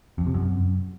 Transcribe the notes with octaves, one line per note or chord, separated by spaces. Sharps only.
F2
C3
F#2